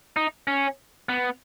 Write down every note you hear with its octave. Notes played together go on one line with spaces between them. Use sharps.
D#4
C#4
B3